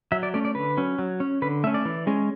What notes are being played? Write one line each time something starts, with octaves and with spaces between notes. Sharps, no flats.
F#3 E5
D5
A3 C#4 D5
D5
D3 B4
F#3 C#4
F#3
C#4
D3 B4
A3 C#4 E5
D5
E3
G#3 C#4